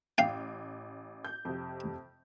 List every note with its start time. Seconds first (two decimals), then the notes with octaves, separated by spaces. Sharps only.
0.18 A1 F5 G5
1.25 G6
1.45 F2 C3